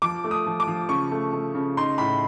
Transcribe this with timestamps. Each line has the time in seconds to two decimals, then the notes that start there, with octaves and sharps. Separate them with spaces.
0.02 F3 D6
0.24 A3
0.31 D#6
0.46 F3
0.60 D6
0.68 F3
0.89 C#3 C#6
1.11 A3
1.33 A3
1.55 C#3
1.77 D#4 C6
1.98 A2 B5